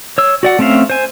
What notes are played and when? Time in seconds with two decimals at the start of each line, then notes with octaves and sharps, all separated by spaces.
0.18 C#5 E6
0.43 F#4 D5 F#5
0.59 A3 C4 C#4 E5 F5
0.90 C5 G#5